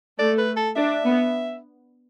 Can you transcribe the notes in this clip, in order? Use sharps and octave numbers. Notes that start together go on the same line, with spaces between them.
A3 D5
B4
A4
D4 E5
B3